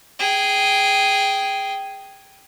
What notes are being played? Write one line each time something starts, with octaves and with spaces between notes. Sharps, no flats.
G#4 G5